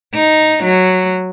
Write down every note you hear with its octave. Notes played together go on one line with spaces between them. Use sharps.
D#4
F#3